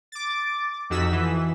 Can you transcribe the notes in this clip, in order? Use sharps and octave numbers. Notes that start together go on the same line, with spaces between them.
D6 A6
F2 D#4 F#4 E6 B6
E3